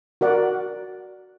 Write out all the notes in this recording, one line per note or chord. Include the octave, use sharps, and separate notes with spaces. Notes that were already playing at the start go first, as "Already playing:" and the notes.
F#4 A#4 D5 F#5